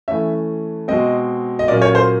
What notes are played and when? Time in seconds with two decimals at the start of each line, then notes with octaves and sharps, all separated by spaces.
0.08 E3 A3 C#4 E5
0.88 B2 G#3 C4 D#5
1.59 D#5
1.68 A#2 F#3 A#3 C#4 D5
1.82 C#5
1.95 C5